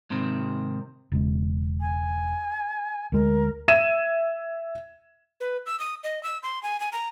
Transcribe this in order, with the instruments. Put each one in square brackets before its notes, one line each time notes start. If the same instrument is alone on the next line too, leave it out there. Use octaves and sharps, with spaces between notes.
[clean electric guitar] G#2 C3 D#3 C4
[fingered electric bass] E1 C#3 G#3
[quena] G#5
[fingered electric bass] D2 G#3 [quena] A#4
[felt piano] E5 G#6 D#7 E7
[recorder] B4
E6
D#6
D#5
E6
C6
G#5
G#5
A#5